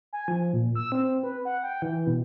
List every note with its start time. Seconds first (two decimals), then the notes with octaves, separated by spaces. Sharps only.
0.13 G#5
0.28 F3
0.53 A#2
0.75 E6
0.92 C4
1.23 B4
1.45 F#5
1.63 G5
1.82 E3
2.07 B2